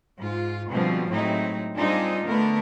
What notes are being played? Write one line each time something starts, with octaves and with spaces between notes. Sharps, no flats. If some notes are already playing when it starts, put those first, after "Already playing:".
G#2 F4
B2 D3 F3 G3 G#3 C4
A2 F#3 G#3 C4 D#4 E4
G3 C4 D4 D#4 F4 G#4
D3 A3 B3 A#4